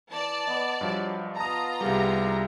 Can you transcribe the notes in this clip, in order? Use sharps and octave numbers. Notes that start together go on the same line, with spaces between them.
E3 D5 A5
B3 D#5 D6
G2 F3 F#3
B3 F4 A5 A#5 D#6
C2 G3 G#4 A#4 F5